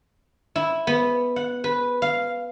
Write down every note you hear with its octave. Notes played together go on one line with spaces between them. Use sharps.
E4
B3
F#5
B4
F5